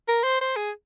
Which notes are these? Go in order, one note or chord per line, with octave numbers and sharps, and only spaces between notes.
A#4
C5
C5
G#4